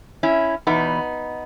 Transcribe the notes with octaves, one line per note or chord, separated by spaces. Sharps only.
C#4 E4
E2 B2 B3 D#4